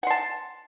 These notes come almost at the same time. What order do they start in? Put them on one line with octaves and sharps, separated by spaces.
F#5 C6 A5